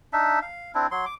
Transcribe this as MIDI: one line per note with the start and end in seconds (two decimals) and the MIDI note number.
0.13 0.39 62
0.13 0.39 63
0.13 0.39 76
0.42 0.72 77
0.75 0.87 60
0.75 0.87 62
0.75 0.87 64
0.91 1.05 54
0.91 1.05 84
1.06 1.14 86